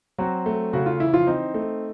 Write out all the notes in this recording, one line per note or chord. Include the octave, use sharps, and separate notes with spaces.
F#3 C4 F#4
A3
C#3 F#4
F4
E3 E4
F3 F4
C4 D#4
A3